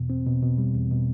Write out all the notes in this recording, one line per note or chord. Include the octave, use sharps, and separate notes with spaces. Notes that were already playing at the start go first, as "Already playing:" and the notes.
Already playing: E2 B2
C4
B2
B2
G3
E2
B2